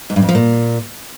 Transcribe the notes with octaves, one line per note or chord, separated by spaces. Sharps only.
G#2
G2
F2
F3
A#2